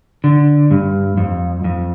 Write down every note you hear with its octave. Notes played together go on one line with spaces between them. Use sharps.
D3
G2
F2
F2